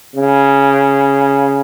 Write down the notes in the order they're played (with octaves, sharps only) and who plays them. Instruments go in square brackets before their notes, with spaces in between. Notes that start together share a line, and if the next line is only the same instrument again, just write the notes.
[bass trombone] C#3